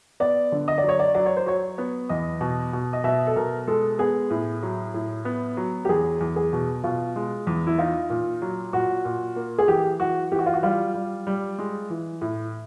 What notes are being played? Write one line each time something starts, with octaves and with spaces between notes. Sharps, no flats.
B3 D5
D3
D#5
D5
F#3
C#5
D5
F#3 D5
C#5
C5
F#3 C#5
B3
E2 D#5
B2
B2
D#5
B2 E5
A4
B2 A#4
G#3 A4
B3 G#4
A2
F#3
A2
B3
F#3
G4
E2 G#4
E2
G#4
B2
B2 F4
G#3
E2
E4
D#4 F4
A#2
F#3
A#2 F#4
A#2
A#3
G#4
E3 G4
E3 F#4
E3 G4
F#4
F4
F#4
G3 F4
G3
G3
G#3
E3
A2